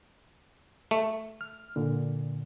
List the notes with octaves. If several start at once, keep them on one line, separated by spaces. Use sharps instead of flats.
A3
F6
A#2 D3